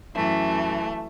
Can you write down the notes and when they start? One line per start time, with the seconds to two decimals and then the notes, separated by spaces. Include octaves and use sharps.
0.14 F#2 E3 A3